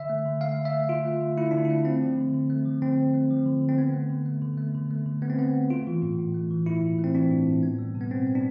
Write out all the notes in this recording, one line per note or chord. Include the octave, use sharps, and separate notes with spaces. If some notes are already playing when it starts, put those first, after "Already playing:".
Already playing: D3 E5
A3
D3
A3 F5
D3
E5
A3
D3 F4
A3
D3
A3 E4
D3 D4
E4
A3
A3 C4
F3
D3
D3
A3
F3
D3 C4
D3
A3
F3
D3
D3
C4
D3 B3
A3
D3
A3
D3
A3
D3
A3
D3
A3 B3
C4
D3 B3
A3
A3 F4
E3
A2
A2
A3
E3
A2 E4
A2
A3
C4
E3 D4
A2
A2
B3
G3
B2
B3
B2 C4
B3
D4